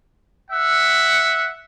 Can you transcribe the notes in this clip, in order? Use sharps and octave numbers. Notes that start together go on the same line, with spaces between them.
E5 F#5